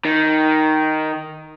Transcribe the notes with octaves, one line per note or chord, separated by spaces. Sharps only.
D#3